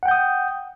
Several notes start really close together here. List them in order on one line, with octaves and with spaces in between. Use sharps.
F#5 G5 G6 D#6